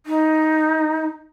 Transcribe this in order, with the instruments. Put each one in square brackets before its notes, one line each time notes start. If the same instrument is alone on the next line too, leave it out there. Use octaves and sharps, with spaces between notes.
[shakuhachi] D#4